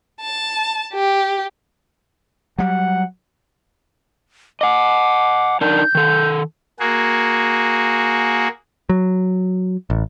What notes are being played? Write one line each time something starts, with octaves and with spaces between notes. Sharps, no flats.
A5
G4
F#3 G3 F#5
D#5 F#5 D6
D4 D#4 A#4 G6
D#3 A4
A#3 F#4 G#4
F#3
A1